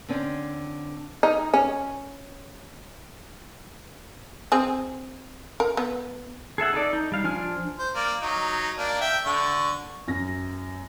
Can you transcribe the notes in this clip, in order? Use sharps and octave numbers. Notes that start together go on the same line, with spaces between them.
D3 C4 C#4
D#4
C#4
C4 G#4
A#4
B3
G#4 A4 E5 F#5
D#4 A4 D5
D#4
G3 F5
F3 D4 G#5 F6
C5
A#3 D5
F#3 D#4
A#3 D4
E5 G5
D3 C#6
F#2 A#6